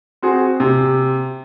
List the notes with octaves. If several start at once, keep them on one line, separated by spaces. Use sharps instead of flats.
C4 F#4 G#4
C3